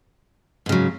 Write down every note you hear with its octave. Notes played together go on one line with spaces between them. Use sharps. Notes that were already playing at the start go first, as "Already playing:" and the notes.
G#2 C#3 F#3